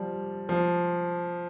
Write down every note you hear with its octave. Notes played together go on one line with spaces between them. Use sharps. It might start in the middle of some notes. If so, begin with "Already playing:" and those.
Already playing: F3 G3
F3